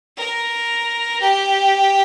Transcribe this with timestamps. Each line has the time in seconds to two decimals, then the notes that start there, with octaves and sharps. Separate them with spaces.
0.17 A#4
1.20 G4